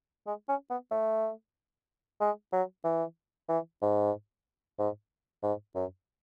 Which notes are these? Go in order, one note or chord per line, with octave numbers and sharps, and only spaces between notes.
G#3
C#4
B3
A3
G#3
F#3
E3
E3
G#2
G#2
G#2
F#2